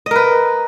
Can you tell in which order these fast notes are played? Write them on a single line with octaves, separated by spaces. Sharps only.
D#5 A#4 B4